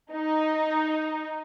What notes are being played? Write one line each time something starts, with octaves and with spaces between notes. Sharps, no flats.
D#4